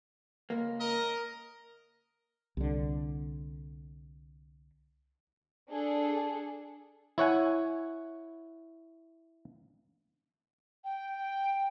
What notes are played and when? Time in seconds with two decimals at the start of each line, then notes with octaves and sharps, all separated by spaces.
0.50 C#2 A#3
0.80 A#4 D#5
2.57 C2 D3
5.70 D4 G#4 A4
7.18 E4 C#5 F#5 G#5
10.84 G5